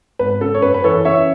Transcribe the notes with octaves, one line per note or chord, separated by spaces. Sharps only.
G#1 B4
C#3 A4
C#5
F#2 B4
B4
E3 A4 C#5
C#3 C#5 E5